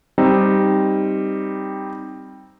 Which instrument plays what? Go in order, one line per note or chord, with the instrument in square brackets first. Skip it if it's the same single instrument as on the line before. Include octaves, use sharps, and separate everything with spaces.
[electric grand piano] G3 C4 D#4